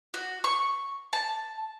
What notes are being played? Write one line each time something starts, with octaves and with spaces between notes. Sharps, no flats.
F#4
C#6
A5